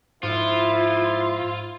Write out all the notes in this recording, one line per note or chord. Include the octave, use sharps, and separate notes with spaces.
G#2 F3 E4 F4